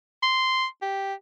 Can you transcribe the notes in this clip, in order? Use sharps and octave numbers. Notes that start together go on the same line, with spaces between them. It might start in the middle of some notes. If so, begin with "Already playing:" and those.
C6
G4